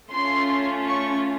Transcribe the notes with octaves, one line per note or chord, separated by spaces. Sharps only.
A3 C#4 F4 C6
C#6